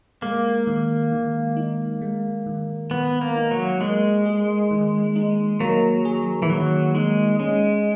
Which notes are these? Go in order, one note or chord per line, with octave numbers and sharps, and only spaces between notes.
G#3 A#3
D#3
D#3
D#4
G#3
D#3
D#3 B3
A#3
D#4
F#3
G#3 A#3
G#4
D#3
D#4
F#3 A#3
G#4
E3
D#3 F#3
G#3 D#4
G#3 C#4